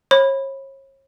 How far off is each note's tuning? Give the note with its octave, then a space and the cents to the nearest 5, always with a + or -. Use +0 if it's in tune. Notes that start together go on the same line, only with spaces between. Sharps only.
C#5 -40 B5 +0